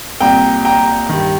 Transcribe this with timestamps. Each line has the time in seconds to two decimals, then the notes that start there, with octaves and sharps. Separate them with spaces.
0.20 C2 A#2 G5 A#5
0.65 G5 A#5
1.09 G2 D#3